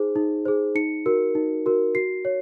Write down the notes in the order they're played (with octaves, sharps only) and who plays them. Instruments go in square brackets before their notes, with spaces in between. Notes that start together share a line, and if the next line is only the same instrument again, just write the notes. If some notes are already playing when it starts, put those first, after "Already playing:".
Already playing: [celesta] D#4 G#4 C5
D#4
G#4 C5
D#4 C#7
F#4 A#4
D#4
F#4 A#4
F#4 C7
C#5